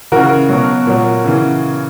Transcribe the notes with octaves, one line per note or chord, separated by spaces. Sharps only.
C#3 E3 F#4 A#4
B2 F#3
A#2 F#3
C#3 E3